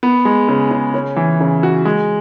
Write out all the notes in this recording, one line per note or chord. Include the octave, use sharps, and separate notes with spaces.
B3
G#3
C#3
C#3
C#4
E3
C#3
F#4
G#3